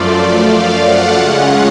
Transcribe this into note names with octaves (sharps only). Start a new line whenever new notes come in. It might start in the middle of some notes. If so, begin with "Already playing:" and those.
Already playing: F#2 F3 A3 F4 D5
F5
F#5
C#3 G#3 C#4 F4